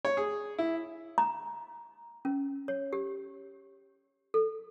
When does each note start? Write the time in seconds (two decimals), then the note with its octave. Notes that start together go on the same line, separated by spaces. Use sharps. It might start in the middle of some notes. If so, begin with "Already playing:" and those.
0.05 C#5
0.17 G#4
0.58 E4
1.18 A#5
2.25 C#4
2.68 C#5
2.93 G4
4.34 A4